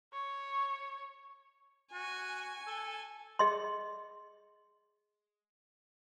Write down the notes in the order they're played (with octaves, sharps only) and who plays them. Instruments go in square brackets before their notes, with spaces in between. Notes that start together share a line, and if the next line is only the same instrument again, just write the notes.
[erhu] C#5
[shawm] F#4 [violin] G#5
[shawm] A4
[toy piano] G#4 D#5 C6